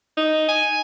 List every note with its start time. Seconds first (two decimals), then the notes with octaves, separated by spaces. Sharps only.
0.17 D#4
0.49 G#5